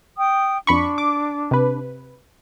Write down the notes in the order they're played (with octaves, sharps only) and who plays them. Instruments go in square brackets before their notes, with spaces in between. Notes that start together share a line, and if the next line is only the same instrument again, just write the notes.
[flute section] G5 D#6
[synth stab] F2 B5 C#6 [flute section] D4
[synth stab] D6
C3 B4